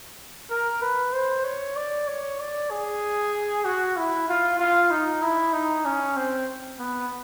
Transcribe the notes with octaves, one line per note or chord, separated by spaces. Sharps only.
A#4
B4
C5
C#5
D5
C#5
D5
G#4
F#4
E4
F4
F4
D#4
E4
D#4
C#4
C4
B3